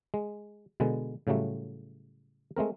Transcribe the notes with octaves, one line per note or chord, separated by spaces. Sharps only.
G#3
B2 D3 G#3 B4
A2 C#3 F#3 G3 A3
G#3 A3 C4 A#4